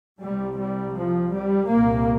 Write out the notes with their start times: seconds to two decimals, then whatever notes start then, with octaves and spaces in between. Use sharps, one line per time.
0.22 C2 C3 G3
0.58 G3
0.95 F3
1.31 G3
1.67 C2 A#2 A#3